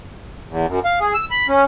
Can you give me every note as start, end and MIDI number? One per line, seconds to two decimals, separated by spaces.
0.49 0.66 40
0.68 0.80 42
0.85 0.99 77
1.00 1.14 68
1.14 1.25 88
1.31 1.47 83
1.48 1.65 61